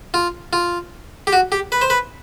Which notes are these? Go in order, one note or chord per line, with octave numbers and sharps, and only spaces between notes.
F4
F4
G4
F#4
G4
B4
C5
B4